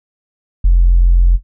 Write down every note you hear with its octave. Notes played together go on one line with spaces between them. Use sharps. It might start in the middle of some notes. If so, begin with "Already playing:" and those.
F1